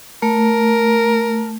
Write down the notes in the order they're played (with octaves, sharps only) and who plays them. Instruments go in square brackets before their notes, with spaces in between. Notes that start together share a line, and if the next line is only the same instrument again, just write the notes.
[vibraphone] A3 [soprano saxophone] A#4